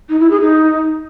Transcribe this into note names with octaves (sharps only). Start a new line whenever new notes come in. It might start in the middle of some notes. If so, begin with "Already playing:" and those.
D#4
E4
G#4
D#4